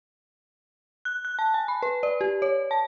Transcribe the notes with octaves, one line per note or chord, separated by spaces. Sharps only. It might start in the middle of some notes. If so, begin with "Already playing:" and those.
F#6
F#6
A5
G#5
B5
B4
D5
G4
C#5
A5